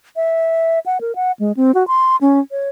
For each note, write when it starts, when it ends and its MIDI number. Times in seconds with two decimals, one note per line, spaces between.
0.16 0.79 76
0.86 1.01 78
1.01 1.15 70
1.15 1.32 78
1.39 1.52 56
1.57 1.72 60
1.74 1.86 66
1.88 2.16 84
2.21 2.40 61
2.51 2.70 73